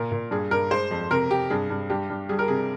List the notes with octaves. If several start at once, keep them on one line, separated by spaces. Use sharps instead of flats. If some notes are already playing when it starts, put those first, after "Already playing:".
Already playing: A#2 A#4
A#2
G2 G#4
G2 A#4
G#3 C5
F2
C3 A#4
C3 G4
G2 G#4
G2
G2 G4
G2
G3 G#4
A#4
C3 G#4